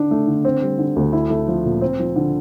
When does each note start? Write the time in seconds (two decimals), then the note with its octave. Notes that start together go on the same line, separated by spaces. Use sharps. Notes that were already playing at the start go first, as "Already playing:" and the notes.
Already playing: D3 D4
0.11 A3
0.27 D3
0.45 C4
0.62 G3
0.78 D3
0.96 D2
1.13 E4
1.30 A3
1.48 F3
1.65 A#2
1.81 C4
1.99 F3
2.16 D3